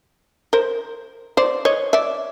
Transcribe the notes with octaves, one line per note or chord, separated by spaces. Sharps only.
A#4 C5
C5 D5
C#5 D#5
D5 E5